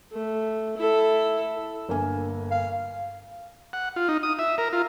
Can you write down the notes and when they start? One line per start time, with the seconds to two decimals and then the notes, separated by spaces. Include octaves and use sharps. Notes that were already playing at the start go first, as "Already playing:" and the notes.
0.12 A3
0.77 E4 A4
1.89 G1 A#3 G#5
2.51 F5
3.73 F#5
3.96 F4
4.09 D#4
4.23 D#6
4.39 E5
4.58 A#4
4.73 F4